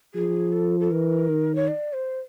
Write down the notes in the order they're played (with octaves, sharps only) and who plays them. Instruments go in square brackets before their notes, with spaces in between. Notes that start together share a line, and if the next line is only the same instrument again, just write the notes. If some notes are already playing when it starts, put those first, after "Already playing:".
[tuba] F3 [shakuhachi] G#4
[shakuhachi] A4
A4
[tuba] E3 [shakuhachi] A#4
[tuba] D#3
[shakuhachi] C#5
D5
C5